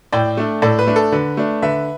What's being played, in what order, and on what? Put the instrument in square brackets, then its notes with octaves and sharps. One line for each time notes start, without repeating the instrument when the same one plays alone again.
[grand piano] A2 D5 G5
A3 D4
A2 A4 D5
B4
A3 D4
A4
D3 B4
A3 D4
D3 B4 E5